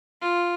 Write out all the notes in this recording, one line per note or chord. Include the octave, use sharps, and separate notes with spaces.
F4